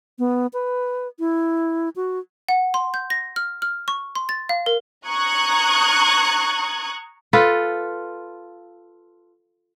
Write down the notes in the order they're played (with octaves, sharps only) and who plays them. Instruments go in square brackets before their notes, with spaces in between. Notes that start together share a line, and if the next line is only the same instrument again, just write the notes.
[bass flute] B3
B4
E4
F#4
[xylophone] F#5
C6
G6
A#6
F6
F6
C#6
C6
A6
F5
A#4
[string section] A#5 C#6 D#6 F#6 G#6
[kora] F4 A4 B4